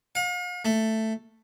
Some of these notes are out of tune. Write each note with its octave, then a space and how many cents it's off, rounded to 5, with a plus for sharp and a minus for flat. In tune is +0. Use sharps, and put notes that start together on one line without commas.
F5 +45
A3 +5